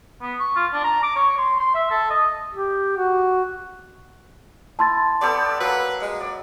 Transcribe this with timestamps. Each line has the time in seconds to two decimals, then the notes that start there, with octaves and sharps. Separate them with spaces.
0.22 B3
0.40 C#6
0.56 F4
0.73 D4
0.84 A#5
1.03 D6
1.16 C#5
1.38 C6
1.60 C6
1.74 E5
1.91 A4
2.10 D#5
2.53 G4
2.97 F#4
4.79 E4 A5 C6 A6
5.21 B3 G4 A4 D5
5.60 F#3 A#3 B4
6.01 G#3
6.20 D5